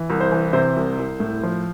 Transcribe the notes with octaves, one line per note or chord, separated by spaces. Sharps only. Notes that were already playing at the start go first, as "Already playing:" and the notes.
Already playing: E3
C2
C5
E3
C3 C5
C2
C2
A2
F3